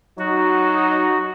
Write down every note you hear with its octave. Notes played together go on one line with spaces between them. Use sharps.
F#3 D#4 F#4